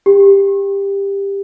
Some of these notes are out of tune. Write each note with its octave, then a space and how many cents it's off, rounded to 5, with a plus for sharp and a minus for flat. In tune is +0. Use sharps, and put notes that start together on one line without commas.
G4 +15